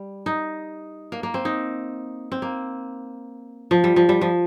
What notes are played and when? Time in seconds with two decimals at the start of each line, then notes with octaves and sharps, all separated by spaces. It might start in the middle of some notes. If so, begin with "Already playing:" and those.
Already playing: G3
0.26 D#4
1.12 A#3
1.23 A#3
1.34 C4
1.45 D#4
2.32 C4
2.42 A#3
3.71 F3
3.84 G3
3.96 F3
4.09 G3
4.21 F3